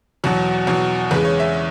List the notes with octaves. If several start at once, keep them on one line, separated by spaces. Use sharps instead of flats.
E2 B2 F#3 F#4
E2 B2 F#3
E2 C#3 G#3 B4
C#5
E5